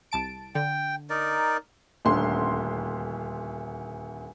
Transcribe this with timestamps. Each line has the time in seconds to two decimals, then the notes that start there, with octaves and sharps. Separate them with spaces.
0.12 C2 A5 D7
0.55 D3 G5
1.10 D#4 A#4 D5
2.05 D#1 D2 C6